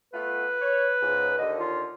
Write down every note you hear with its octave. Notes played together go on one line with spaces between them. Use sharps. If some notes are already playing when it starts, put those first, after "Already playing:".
A3 B3 F4 B4
C#5
C#2 G#2
D#2 D3 D#5
F4